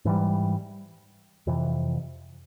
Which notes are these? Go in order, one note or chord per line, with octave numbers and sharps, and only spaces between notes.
G#2 E3 G3
F2 C3 E3